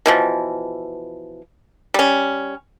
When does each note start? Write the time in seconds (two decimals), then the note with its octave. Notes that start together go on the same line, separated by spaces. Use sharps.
0.06 B2 E3 F3
1.94 G3 C#4